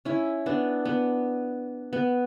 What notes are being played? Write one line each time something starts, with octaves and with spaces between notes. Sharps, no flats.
C#4 E4
B3 D4
B3
B3